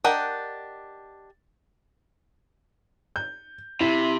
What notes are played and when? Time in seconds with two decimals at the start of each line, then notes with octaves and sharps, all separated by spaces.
0.04 D4 G4 A#4 D#5 F#5
3.16 G6
3.80 C3 E4